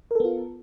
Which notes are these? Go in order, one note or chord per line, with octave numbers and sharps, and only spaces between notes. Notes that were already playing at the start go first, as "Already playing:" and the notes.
B3 F4 A4 A#4